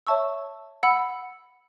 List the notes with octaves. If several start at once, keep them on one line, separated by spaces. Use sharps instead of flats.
C#5 E5 A5 C#6 E6
F#5 B5 E6